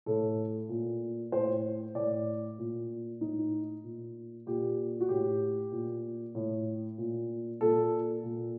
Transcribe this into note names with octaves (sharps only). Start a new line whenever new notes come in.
A2 A4
A#2
A2 C5
A2 D5
A#2
A2 D#4
A#2
A#2 G4
F#4
A2 G4
A#2
A2
A#2
A#2 A4
A#2